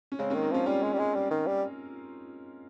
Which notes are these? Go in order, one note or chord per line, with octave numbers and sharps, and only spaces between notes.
C#4
C#3 G#3 C4
D#3 A#3 C#4
C4 D#4
F3 C#4 F4
G3 C#4 F4
G#3
G3
G#3
G3
D#3
G3